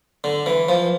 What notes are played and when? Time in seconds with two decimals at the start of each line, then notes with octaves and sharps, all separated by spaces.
0.24 D3
0.46 E3
0.69 F3